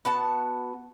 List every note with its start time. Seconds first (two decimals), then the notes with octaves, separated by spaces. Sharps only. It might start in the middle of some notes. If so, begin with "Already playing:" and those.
0.05 B3 F#4 A5